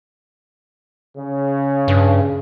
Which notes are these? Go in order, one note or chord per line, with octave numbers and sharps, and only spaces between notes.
C#3
G2